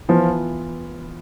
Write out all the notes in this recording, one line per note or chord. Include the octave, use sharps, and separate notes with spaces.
E3 F3 B3 F4